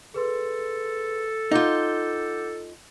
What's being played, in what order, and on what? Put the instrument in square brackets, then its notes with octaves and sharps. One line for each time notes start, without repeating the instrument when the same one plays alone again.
[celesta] G#4 B4 C6 [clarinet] A4
[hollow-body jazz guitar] D#4 F4 [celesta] F#5 D6 G6